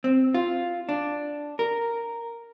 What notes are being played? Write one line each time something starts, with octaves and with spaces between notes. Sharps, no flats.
C4
F4
D4
A#4